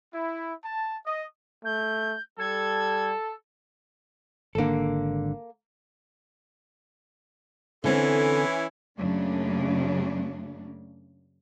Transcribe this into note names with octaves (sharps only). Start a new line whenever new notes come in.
E4
A5
D#5
A3 G6
G3 A4 G#6
G#1 D3 A#3 A4
D3 E3 C4 C#4 E4 A4
F#2 C#3 F#3 A3 A#3 D4